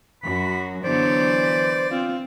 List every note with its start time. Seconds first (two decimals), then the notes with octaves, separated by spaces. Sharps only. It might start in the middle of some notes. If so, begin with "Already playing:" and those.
0.23 F#2 F#4 B5
0.84 D3 E3 F#3 B3 C5 D5
1.91 C4 F4